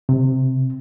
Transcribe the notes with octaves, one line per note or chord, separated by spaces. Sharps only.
C3